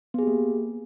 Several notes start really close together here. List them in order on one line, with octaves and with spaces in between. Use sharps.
B3 G#4 G4 A#3